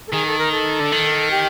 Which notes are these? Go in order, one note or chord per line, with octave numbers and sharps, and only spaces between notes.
A4
D#3 G#4
A4
A#4
A4
D3
D#3
G4